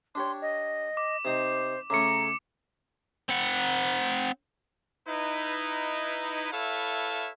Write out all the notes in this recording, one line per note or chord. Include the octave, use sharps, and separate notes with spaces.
D4 G4 C#5 C6
D#5
D6
C3 D#4 C5 A#5
C#3 A3 C#4 A#5 D6 C#7
C4 F#5
D#4 E4 B4
E4 A4 B4 C#5 E5 F5